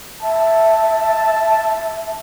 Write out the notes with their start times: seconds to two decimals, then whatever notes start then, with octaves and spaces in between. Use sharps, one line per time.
0.23 E5 A5